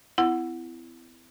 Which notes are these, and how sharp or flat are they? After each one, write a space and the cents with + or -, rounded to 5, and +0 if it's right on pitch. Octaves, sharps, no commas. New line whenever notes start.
C4 -45 E4 +15 F#5 +0